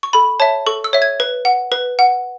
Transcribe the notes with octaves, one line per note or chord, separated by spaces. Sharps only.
C#6
A4 B5
C#5 E5 A5
A4 C#6
E6
C#5 E5
G#6
B4
F#5
B4
F#5